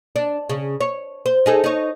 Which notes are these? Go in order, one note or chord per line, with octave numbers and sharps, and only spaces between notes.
D4
C#3
C#5
C5
D#4 G#4 A4
D#4 C#5